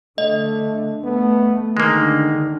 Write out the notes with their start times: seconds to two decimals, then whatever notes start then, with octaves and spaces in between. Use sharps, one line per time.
0.18 D3 A3 D#5
1.04 A3 B3
1.77 D3 D#3 G#3 A#3